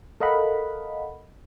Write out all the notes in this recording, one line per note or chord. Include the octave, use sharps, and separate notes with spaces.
A4 A#4 D#5 F5 F#5 B5